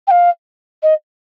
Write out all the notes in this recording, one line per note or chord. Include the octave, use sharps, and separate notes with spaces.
G5
F5
D#5